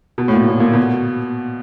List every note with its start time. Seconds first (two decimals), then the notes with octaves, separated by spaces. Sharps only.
0.18 B2
0.28 A2
0.33 A#2
0.48 B2
0.60 A#2
0.73 B2